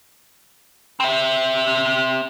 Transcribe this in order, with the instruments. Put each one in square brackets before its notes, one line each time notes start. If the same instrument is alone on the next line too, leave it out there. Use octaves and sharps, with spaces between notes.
[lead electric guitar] C4 E5